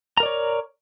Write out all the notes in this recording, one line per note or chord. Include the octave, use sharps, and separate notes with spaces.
A#4 C#5 D5 A#5